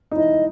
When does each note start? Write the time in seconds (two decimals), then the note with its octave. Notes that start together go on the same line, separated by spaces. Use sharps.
0.12 D#4
0.16 E4 D#5